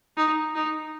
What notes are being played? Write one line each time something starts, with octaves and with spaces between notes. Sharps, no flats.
D#4
D#4